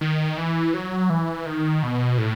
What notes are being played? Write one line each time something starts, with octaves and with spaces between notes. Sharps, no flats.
D#3
E3
F#3
E3
D#3
B2
A2